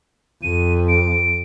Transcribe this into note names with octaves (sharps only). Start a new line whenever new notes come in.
F2 D#7
D7